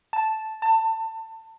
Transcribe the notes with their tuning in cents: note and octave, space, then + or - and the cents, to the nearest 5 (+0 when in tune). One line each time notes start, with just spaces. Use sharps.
A5 -5
A5 +25